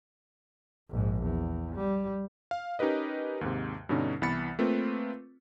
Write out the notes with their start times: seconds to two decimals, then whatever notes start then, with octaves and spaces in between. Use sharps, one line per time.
0.90 A#1 G#2
1.23 E2
1.76 G3
2.51 F5
2.79 C#4 D#4 G4 A#4 B4 D#5
3.41 D#2 G#2 C3
3.89 G2 B2 D3 C#4 D#4
4.22 C2 E3 B3 B5 A6 C#7
4.59 A3 A#3 C4 F4 B4